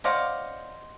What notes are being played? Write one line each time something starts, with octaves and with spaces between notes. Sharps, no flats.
C#4 C5 D5 D#5 F5 F#5